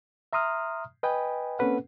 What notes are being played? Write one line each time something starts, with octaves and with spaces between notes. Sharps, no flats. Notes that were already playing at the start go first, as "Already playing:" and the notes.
E5 A#5 C6 D#6 F6
B4 D#5 G5 G#5 B5
A#3 C4 C#4 A4 B4 F#5